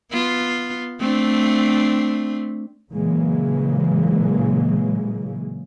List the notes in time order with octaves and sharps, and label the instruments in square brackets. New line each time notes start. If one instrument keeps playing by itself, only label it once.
[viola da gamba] B3 F4
A3 C4 D4
[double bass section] A#2 C#3 E3 F#3 G#3 A#3